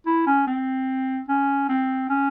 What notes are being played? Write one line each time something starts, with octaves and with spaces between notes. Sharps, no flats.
E4
C#4
C4
C#4
C4
C#4